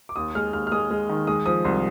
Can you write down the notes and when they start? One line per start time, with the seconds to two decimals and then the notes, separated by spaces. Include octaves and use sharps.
0.09 D6
0.16 D#2 D#6
0.35 G#3 F6
0.53 D#2 F6
0.67 F6
0.72 G#3 D#6
0.90 G#3
1.09 D#3
1.27 G#3 D#6
1.46 F3 D#6
1.64 C2 C6